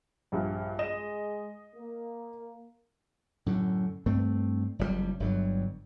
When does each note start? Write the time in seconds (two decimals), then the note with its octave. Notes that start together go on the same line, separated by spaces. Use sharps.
0.32 A#1 G2
0.79 G#3 D#5 E7
1.76 A#3
3.46 F#2 A2 D3
4.06 G2 A3 C4
4.79 F#1 F2 A2 G3
5.20 G1 G2 D3 F#3